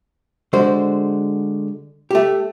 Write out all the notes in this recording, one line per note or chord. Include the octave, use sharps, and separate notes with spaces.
D3 G#3 F#4 C5
A3 G4